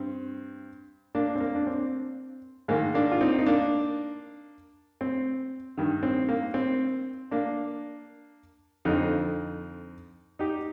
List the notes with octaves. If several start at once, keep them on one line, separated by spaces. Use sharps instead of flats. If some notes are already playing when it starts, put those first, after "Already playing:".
Already playing: G2 C4
A#3 D4
C4
A#3
D4
C4
G#2 D#3 A#3
A#3 D4
F4
C4 D#4
D#4
A#3 D4
C4
G2 D#3
C4
A#3
C4
A#3 D4
F2 D3 C4 D#4
D#4 G4